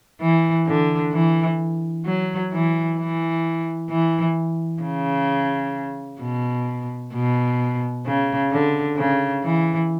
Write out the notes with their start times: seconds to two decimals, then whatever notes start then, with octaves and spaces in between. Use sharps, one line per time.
0.21 E3
0.67 D3
1.13 E3
2.06 F#3
2.52 E3
2.98 E3
3.90 E3
4.83 C#3
6.21 B2
7.14 B2
8.06 C#3
8.52 D3
8.97 C#3
9.44 E3